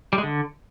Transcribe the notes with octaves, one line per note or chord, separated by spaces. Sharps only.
G3
G#3
D3